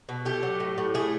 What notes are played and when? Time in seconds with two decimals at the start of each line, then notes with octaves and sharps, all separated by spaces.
0.09 B2
0.25 A3 G4
0.43 F#3
0.60 A2
0.78 A2
0.94 A3 G#4